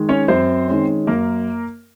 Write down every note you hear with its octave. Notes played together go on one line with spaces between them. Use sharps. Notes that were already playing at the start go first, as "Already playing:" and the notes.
Already playing: D#3 G#3
C#4 C#5
F#2 C4 C5
D#3 G#3 C#4
F#2 A#3 A#4